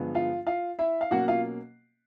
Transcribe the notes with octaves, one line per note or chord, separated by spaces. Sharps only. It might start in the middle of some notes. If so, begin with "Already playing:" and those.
Already playing: G2 D3 F3 G#3 B3
F4 F5
F4 F5
E4 E5
F5
B2 F#3 A#3 C#4 F#4 F#5
F4 F5